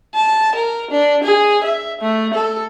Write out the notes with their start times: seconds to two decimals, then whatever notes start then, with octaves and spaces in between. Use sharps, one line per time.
0.15 A5
0.56 A#4
0.91 D4
1.24 G#4
1.64 E5
2.01 A3
2.34 A4